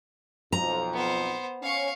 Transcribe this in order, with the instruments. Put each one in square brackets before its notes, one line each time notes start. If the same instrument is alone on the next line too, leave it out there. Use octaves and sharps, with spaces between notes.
[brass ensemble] B1 F2 F3 [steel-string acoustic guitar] A#5
[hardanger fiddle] B3 C5
[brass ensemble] C#4 [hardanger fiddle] F5 C#6